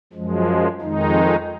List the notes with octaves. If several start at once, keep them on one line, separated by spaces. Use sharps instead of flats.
F#2 F3 G#3
F2 D#3 G#3 D#4